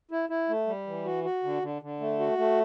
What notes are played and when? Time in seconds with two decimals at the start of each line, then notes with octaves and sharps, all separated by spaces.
0.11 E4
0.29 E4
0.49 A3
0.67 G3
0.87 E3
1.06 F#4
1.24 F#4
1.44 D3
1.62 D3
1.82 D3
2.00 A3
2.20 F#4
2.38 A3